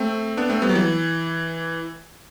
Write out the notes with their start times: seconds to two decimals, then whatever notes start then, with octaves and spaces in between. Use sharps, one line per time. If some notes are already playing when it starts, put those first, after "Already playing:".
Already playing: A3 C4
0.37 B3 D4
0.50 A3 C4
0.62 G3 B3
0.69 F#3
0.75 E3